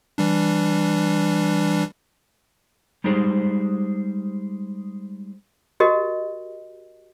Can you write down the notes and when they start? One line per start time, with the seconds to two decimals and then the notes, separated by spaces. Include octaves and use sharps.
0.18 E3 G3 D4
3.04 G3 G#3 D#4 G4 G#4 C5
5.80 F#4 G4 A#4 D#5